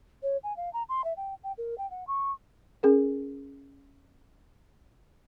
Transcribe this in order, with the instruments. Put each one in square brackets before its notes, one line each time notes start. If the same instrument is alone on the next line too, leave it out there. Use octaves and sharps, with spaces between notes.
[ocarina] C#5
G#5
F5
A#5
C6
E5
G5
G5
A#4
G5
F#5
C#6
[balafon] C#4 G#4 A#4